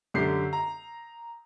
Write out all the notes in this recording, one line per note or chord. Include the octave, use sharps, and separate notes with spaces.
F#2 D3 G4 C7
A#5